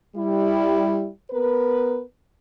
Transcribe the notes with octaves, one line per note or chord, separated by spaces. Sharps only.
G3 E4
B3 A#4 B4